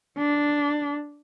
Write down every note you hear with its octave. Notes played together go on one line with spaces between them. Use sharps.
D4